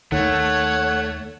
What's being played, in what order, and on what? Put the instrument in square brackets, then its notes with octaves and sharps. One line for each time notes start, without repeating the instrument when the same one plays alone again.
[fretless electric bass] D#2 D#3 [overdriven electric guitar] A3 [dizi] C#5 [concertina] F#5